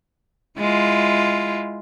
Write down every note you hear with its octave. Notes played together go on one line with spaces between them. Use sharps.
G#3 E4 F4